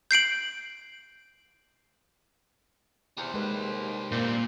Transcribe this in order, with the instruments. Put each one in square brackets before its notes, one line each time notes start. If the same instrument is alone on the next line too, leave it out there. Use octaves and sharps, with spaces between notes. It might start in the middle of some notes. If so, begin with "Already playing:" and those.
[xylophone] G6 C7 D7 F#7
[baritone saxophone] E2 [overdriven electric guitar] G3 C5
[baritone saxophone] D#2 [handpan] G#3 B4
[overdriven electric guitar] G2 G3 [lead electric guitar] A#2 [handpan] A#3 [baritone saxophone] C4